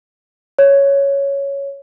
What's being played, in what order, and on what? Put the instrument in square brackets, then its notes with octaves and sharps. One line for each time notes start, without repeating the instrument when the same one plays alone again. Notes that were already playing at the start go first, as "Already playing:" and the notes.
[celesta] C#5